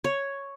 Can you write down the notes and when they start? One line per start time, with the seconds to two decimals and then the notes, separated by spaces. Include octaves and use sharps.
0.04 C#5